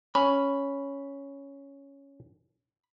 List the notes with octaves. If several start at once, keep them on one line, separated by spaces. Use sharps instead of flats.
C#4 B5